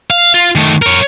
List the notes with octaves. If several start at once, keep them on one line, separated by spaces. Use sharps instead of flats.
F5
F4
D#3 A3
A#4 C#5